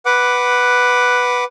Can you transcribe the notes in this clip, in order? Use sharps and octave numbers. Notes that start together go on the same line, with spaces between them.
B4 F#5 D6